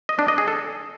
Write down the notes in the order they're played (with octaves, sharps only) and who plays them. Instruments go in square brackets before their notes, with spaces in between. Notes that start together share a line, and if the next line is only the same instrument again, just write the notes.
[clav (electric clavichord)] D#5
D4
D#5
G#4
A4